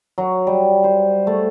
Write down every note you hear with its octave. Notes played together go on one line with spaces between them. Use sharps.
F#3
G3
C5
A3